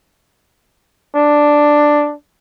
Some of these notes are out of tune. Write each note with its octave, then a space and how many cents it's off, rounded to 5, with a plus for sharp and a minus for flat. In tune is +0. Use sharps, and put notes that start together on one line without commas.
D4 +5